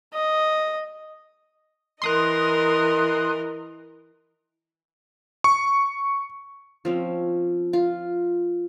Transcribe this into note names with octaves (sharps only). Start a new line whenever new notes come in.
D#5
E3 A#4 D#5 C6 D#6 F#6
C#6
F3 C4 C#4
F4